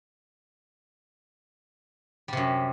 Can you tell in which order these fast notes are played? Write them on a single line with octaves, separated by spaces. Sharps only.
G3 C3 F#2